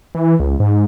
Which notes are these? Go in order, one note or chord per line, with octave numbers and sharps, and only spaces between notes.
E3
C#2
G#2